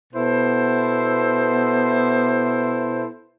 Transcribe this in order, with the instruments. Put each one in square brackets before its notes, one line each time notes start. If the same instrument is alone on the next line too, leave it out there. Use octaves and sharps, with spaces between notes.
[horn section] B2 B3 E4 A4 C5